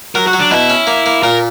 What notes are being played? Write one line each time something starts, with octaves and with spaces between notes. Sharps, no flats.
F#3 A#4
F#4
F#3
D4
B2 E4
C#4
A#3
A#3
A#2 A#4